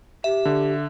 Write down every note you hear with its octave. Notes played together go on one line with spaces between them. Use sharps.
G4 E5
D3